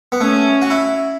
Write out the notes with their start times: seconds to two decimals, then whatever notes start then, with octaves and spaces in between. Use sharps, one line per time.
0.12 B3
0.21 A3 C#4
0.62 F#4
0.70 E4